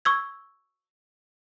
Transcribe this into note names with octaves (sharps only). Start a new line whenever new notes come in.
C#6 E6 G#6